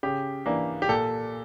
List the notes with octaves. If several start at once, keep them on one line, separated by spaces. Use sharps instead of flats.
C#3 G4
E3 A#3 D4
G4
A#2 A4